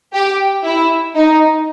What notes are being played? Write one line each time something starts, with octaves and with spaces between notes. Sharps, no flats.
G4
E4
D#4